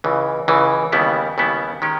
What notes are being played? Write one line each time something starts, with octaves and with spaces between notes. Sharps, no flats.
C#2 C#3 E3
C#2 C#3 E3
D#2 C#3 G3 B3 E4
D#2 C#3 G3 B3 E4
D#3 G#3 C#4 G4